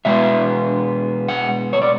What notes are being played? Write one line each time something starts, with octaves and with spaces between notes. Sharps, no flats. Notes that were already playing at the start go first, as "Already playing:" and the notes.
B2 G#3 B3 E5
F#5
C#5
D5